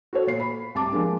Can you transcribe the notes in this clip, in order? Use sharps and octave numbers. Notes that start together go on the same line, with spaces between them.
F#4 A4 C#5
A#2 C7
B5
C2 A5 D6
F3 G#3 A#3 D4